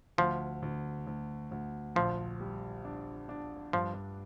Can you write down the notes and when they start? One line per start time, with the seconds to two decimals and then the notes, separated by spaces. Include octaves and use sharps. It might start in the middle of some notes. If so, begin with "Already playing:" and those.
0.18 D2 F3
0.62 D2
1.07 D2
1.51 D2
1.95 A#1 F3
2.40 G3
2.85 D4
3.29 D4
3.73 G2 F3